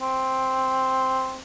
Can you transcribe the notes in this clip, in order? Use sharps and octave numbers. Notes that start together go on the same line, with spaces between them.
C4